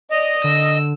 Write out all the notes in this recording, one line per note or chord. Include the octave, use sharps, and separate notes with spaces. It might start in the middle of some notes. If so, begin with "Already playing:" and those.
D5 D#5 F7
D3 E6